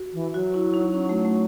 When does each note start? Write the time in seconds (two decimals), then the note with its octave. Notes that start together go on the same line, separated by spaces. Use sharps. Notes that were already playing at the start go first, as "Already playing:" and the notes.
Already playing: F#4
0.13 E3
0.34 F#3 F#4
0.54 E4
0.74 D#4
0.94 C#4
1.09 A3
1.25 A3